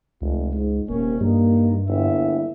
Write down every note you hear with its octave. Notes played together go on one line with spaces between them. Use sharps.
F1 C#2
G#2
D#1 D#2 C3 A#3 C#4
G2 G3 A#3 D#4
G1 D#2 E4 E5